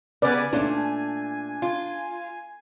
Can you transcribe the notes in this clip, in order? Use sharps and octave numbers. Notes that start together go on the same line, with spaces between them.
C#3 B3 B4 D5 G#5
A#2 A3 D4
F4